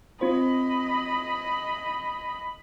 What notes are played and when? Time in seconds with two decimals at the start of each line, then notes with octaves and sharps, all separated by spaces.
0.21 C4 F4 C5 D#5 B5